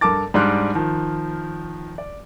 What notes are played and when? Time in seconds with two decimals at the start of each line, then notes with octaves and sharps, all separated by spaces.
0.01 G2 A4 A#4 A5 D6 A6
0.34 G#2 G3 D4 C6 F6 F#6
0.75 D#3 F3
1.98 D5